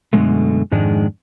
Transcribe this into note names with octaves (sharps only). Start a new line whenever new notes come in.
F#2 B2 D3 D#3 G#3 A3
F2 G#2 D#3 G#3 D4